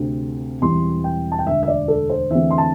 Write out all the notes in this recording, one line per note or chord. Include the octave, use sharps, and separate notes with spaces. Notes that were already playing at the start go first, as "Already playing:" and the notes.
Already playing: D2 C3 A3 C4
E1 E2 E3 G3 C4 C6
G5
A5
G5
E1 D2 D3 E5
E5
D5
A4
C5
E2 D3 A3 C4 E5
C6
A5